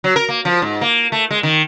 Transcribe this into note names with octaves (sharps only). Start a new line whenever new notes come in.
F#3
A#4
A#3
F3
G#2
A#3
A3
G#3
D#3